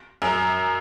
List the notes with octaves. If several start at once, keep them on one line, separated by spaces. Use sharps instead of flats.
F#2